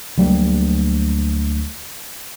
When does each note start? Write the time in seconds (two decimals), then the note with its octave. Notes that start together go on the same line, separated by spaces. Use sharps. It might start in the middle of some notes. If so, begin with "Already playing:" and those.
0.18 D2 F#3 G3 A#3